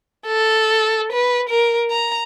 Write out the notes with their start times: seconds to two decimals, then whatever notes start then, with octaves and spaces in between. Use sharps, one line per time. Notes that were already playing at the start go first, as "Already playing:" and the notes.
0.26 A4
1.12 B4
1.49 A#4
1.90 A#5